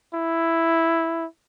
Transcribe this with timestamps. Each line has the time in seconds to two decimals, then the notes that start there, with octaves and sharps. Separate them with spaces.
0.14 E4